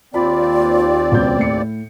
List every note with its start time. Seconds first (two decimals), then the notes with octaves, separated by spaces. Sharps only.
0.14 D#2 C4 F4 D5 B5
1.12 C#2 B2 G6
1.39 A2 C#7